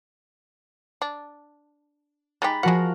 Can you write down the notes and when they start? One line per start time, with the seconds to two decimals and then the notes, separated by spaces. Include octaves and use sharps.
1.02 D4
2.42 G#3 D#4 G4 B5 A6
2.63 F3 G#3 F#4 A#4 F#5